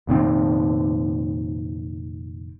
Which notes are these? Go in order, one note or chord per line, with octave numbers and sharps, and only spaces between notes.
F1 A#2 D#3 C4